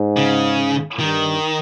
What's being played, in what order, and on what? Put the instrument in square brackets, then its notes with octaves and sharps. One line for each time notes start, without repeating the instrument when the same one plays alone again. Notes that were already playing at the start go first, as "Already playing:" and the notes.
Already playing: [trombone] G#2
[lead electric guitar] C#3
[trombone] G2 [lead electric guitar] D#3